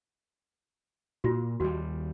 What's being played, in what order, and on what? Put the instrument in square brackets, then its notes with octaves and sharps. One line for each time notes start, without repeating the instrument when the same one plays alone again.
[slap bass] A#2 [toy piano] F4 F#4
[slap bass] D#2 G3 [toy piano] F#4